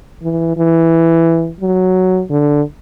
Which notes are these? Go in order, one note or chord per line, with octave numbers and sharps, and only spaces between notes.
E3
E3
F#3
D3